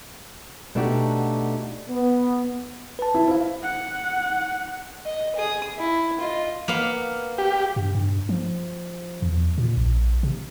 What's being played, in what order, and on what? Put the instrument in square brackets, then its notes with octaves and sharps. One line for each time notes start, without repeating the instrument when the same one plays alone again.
[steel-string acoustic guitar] B2 A3 D4 D#4 F#4 G4
[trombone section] B3
[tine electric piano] B4 A5
[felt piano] E4
[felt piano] E4 [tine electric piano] C5 F5
[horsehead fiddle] F#5
[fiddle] D#5
G#4 D#6
E4
F4 D#5
[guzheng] A#3 B3 F5
[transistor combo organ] G4
[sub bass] G2
G2
F3
E2
A#2
A#1
C3